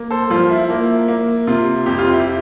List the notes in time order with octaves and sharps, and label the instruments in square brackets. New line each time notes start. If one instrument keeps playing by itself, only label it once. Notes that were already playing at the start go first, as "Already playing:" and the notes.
Already playing: [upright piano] A#3
[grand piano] A4 C5
[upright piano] F3 [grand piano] F4
[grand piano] E4
[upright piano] A#3
A#3
[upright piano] C3 [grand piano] F4
[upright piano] F2 [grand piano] G4
[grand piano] F4
E4 G4